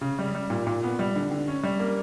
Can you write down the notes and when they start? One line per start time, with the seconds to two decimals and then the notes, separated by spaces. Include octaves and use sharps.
0.01 C#3
0.19 G3
0.35 G3
0.50 A#2
0.67 A#2
0.83 B3
0.99 G3
1.16 D3
1.31 D3
1.48 C#4
1.64 G3
1.80 A#3